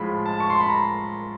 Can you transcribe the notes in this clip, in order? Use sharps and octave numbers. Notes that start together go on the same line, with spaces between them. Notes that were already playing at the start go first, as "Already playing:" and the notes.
Already playing: A2 F3 G#3 B5
A5
C#6
C6
B5
A#5